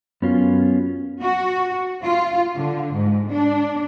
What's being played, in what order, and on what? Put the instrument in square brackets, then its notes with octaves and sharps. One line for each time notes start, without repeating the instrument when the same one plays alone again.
[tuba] F#2 [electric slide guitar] B3 C#4 F4
[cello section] F#4
F4
D3
G#2
D4